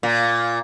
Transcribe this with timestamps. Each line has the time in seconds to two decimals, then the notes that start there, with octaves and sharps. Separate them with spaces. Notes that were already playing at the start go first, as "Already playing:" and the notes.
0.03 A#2